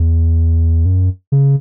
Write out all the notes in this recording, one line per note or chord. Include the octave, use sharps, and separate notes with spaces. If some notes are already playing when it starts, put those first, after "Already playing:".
Already playing: E2
F#2
C#3